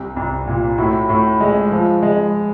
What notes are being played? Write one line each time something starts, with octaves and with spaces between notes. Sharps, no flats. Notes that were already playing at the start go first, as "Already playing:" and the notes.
Already playing: C2
C2
A#2
A2 E4 F#4
A2
G#3
F3
G#3